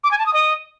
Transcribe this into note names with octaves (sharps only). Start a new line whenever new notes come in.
D6
G#5
A5
D#6
D#5